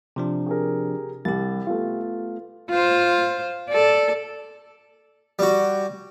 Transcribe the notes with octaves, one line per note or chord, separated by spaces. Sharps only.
C3 F3 D4
G4 G#4 A#4
C2 G4 A6
A3 B3 F4
F4 C5
A4 D5
G3 F#4